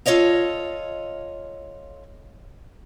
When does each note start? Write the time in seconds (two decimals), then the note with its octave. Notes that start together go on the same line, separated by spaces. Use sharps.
0.06 F4 A4 C#5 D#5 F5